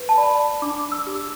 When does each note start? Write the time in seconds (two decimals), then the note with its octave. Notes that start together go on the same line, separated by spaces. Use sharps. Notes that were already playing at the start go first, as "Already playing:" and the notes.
Already playing: B4
0.09 A5
0.17 D5 B5
0.62 D4 D6
0.92 E6
1.07 G4